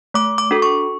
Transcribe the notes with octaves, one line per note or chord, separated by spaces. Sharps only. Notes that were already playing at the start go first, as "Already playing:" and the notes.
A3 D6
D6
D4 F#4 A4
C#6